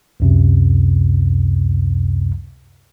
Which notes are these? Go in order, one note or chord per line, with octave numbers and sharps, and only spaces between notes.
C#2 F#2 C3